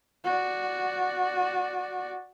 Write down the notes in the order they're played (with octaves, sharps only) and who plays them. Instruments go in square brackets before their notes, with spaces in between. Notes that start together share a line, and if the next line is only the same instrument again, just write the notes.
[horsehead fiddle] F#4 D5